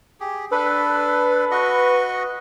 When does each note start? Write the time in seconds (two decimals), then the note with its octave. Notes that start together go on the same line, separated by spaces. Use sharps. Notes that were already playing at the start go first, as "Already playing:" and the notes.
0.20 G4 G#4
0.51 D4 A4 B4
1.51 F#4 D#5 C#6